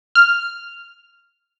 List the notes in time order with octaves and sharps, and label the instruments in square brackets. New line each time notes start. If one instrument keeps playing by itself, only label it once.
[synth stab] F6